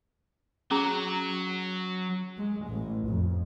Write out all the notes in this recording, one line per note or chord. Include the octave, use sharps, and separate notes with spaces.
F#3 C#4 G#4 A#5
G#3
A1
F2